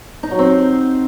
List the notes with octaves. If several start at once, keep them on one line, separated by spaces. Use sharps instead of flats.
D#4
F#3
C4